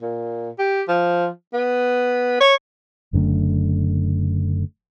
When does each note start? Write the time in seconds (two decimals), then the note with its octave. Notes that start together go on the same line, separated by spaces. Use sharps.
0.02 A#2
0.59 G4
0.88 F3
1.53 B3
2.40 C#5
3.13 F#1 F#2 D3 A3